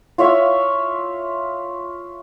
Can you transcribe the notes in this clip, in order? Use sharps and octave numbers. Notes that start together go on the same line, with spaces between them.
F4 C#5 E5 F5